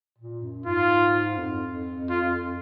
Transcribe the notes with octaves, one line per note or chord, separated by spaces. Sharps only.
A#2
F#2
G#2 F4
F2
F4